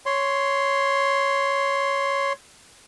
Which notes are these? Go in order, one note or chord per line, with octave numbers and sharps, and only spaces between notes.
C#5 C6